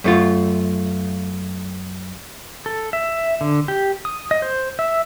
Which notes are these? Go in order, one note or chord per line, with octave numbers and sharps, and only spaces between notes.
F#2 A3 F4
A4
E5
D3
G4
D#6
D#5
C5
E5